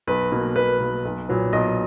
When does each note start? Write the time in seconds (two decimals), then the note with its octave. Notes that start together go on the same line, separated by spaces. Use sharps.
0.07 B1 B4
0.32 B2 A#3
0.56 B1 B4
0.80 B2 A#3
1.05 B1
1.29 A#2 F#3 B3
1.53 B1 D#5